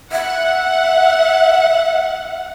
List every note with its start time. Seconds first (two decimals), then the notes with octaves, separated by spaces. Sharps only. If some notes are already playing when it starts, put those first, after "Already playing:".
0.12 E5 F#5